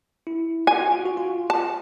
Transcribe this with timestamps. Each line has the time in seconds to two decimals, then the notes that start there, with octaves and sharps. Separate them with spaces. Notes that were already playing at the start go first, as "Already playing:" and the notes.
0.27 E4
0.67 F4 G#5
0.80 F#4
0.92 F4
1.06 F#4
1.17 F4
1.50 A5